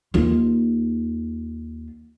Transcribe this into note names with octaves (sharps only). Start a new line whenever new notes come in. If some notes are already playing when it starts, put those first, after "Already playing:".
D#2 F4